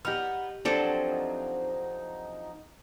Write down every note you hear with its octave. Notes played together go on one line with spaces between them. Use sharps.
B3 D#4 G4 F6
F3 F#3 C4 D4 A4 C5 D5
D#4